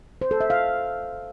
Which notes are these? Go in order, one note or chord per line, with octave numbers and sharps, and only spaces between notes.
C5
A4
E5
F5